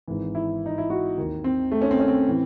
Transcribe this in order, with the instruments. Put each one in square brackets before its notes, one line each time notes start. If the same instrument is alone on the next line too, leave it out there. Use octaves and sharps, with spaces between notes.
[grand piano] G#1 G#2 E3
E4
D#4
E4
F#4
D#2 D#3
C4
A3
C#4
C4
C#4
C4
A2 E3